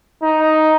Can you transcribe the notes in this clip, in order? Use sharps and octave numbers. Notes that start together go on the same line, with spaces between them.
D#4